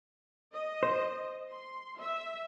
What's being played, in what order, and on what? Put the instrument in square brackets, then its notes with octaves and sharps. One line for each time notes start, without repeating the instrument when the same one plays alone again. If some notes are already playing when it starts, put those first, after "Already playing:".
[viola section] D#5
[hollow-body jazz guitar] C5
[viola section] C6
E5